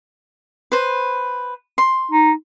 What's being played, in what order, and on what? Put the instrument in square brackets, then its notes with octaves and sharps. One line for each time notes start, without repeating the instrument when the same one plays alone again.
[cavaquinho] B4 C5
C6
[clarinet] D#4